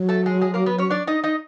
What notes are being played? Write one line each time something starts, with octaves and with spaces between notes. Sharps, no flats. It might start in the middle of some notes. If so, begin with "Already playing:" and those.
Already playing: F#3
A3 A4
G#3 G#4
G#3 G#4
A#3 A#4
B3 B4
C#4 C#5
D4 D5
D#4 D#5
D#4 D#5